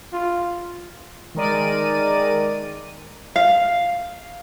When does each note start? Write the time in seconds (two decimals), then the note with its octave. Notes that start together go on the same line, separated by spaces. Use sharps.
0.13 F4
1.35 D#3 G#3 A#4 D5 D#7
3.36 F5